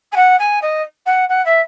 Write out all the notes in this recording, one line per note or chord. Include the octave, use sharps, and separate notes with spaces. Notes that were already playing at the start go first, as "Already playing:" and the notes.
G#5
F#5
G#5
D#5
F#5
F#5
E5